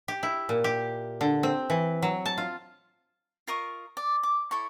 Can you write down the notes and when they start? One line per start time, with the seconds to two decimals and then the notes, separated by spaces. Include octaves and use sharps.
0.08 G4
0.23 E4
0.49 A#2
0.64 G4
1.21 D3
1.43 C4
1.70 E3
2.02 F#3
2.26 A5
2.38 F4
3.47 F4 A#4 D#5 C#6
3.97 D5
4.23 D6
4.51 E4 A4 C#5 C#6